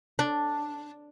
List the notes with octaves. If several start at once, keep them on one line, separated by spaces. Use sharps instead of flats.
D4